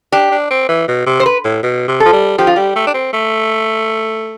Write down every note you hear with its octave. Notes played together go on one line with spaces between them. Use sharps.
D4 G4
D4
C4
E3
B2
C3
C5
B4
A2
B2
C3
A4
F3
G3
F3 G4
F4
G3 G4
A3
D4
C4
A3